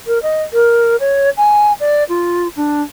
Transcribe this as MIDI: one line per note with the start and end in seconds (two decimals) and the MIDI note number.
0.07 0.21 70
0.23 0.42 75
0.53 0.96 70
1.00 1.30 73
1.37 1.73 80
1.80 2.04 74
2.09 2.48 65
2.56 2.83 62